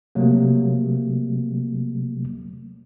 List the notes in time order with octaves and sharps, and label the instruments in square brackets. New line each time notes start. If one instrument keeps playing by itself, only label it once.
[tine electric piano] C3 F#3 A3 A#3